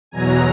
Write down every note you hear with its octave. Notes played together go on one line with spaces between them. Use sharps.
E2 B2 F#3 G#5 A#5